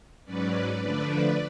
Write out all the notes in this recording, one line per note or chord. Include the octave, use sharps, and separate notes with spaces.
G#2 F#3 C#4 B4 D5
D3 F3 A3 D4 B4 D5